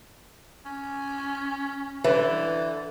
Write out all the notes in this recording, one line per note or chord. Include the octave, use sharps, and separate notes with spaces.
C#4
D3 E3 B4